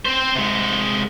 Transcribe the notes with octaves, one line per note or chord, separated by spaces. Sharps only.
C4 C5
C3 G#3